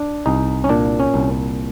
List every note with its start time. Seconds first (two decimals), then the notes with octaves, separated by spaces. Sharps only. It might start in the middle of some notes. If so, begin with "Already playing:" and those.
Already playing: D4
0.26 C2 D#4
0.64 C#4
0.69 A#2 D4
1.00 C#4
1.14 C2